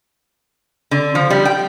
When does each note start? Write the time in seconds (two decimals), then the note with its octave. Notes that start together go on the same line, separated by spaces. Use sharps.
0.91 D3
1.15 F3
1.30 G3
1.45 G5